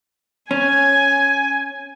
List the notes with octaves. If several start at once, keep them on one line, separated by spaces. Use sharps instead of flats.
C#4 G#5